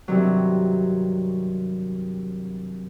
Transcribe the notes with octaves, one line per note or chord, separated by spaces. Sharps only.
G2 C3 D#3 F#3